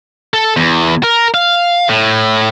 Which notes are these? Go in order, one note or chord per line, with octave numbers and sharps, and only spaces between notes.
A4
E2
A#4
F5
A2